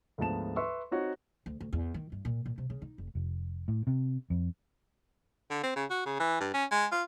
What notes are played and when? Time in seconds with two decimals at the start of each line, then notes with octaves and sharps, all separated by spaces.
0.18 D2 G#2 F3 B3 A5 E7
0.56 B4 E5 C6 C#6 E6
0.91 C4 D#4 F#4 C#5
1.46 D2
1.60 D2
1.73 E2
1.94 D#3
2.12 G2
2.25 A#2
2.46 A#2
2.58 C3
2.70 C#3
2.82 D#4
2.98 F1
3.15 F1
3.68 A2
3.87 C3
4.30 F2
5.51 D3
5.63 C4
5.76 C#3
5.90 F#4
6.06 C#3
6.20 E3
6.40 G2
6.54 C#4
6.72 G#3
6.92 F4